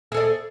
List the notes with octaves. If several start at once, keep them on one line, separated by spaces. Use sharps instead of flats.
G#4 A4 D5